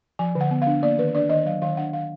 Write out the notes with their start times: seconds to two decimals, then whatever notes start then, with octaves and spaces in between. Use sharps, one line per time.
0.19 F3 G#5
0.35 D3
0.41 F#5
0.51 B3
0.62 F5
0.67 D4
0.83 A#3 D5
0.98 D#3 B4
1.15 D4 D5
1.29 D#3 D#5
1.46 F#3 F5
1.62 D#3 F5
1.77 D4 F#5
1.93 D#3 F5